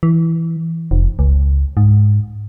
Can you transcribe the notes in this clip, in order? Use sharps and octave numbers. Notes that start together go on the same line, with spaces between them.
E3
F1
C#2
G#2